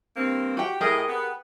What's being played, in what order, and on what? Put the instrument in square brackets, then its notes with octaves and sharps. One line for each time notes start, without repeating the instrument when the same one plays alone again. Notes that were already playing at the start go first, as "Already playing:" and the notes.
[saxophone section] G2 A#3 C4
[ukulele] F#4 G5 [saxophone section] G4
[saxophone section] A2 D#5 [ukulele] G4 G#4 A#4
[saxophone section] B3 B4